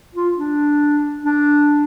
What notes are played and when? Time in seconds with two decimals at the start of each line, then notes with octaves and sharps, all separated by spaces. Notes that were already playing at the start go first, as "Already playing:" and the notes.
0.15 F4
0.38 D4
1.24 D4